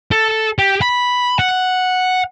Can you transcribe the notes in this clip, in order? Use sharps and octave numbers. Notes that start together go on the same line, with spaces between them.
A4
G4
B5
F#5